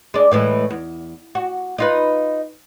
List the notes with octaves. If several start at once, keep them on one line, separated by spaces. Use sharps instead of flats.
G#3 D4
A2 E3 G#3
E2
F#4
D#4 F4 B4